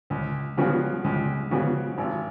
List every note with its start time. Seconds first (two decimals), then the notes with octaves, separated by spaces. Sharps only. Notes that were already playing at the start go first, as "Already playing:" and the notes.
0.10 C#2
0.57 C#3 F3 B3 F#4
1.04 C#2
1.51 C#3 F3 B3 F#4
1.98 G#1